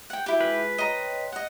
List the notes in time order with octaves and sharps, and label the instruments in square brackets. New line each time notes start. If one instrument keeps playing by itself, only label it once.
[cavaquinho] F#5 G5
[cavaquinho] E4 G4 [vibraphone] F#4
[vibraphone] G#3 F4 G#4 [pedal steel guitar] B4
[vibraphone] C#5 G5 C6 [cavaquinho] D#5 A#5
[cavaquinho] D#5 F#5